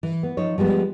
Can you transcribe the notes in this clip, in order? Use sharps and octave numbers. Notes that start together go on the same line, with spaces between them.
E3
B3
F3 D#4 C#5
F3 G3 G#3 B3